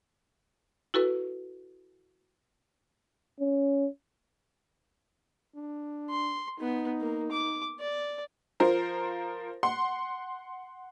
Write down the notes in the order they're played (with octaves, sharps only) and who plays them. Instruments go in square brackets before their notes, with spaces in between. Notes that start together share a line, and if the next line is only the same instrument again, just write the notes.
[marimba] E4 F#4 A4 B4
[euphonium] C#4
[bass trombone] D4
[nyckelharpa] C6
[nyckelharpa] B3 [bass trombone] D#4
[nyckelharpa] A#3
D6
D5
[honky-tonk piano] F3 A#4 C5
F#5 C6